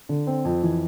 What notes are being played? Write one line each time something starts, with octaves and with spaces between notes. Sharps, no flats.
D3
C4
F2
E3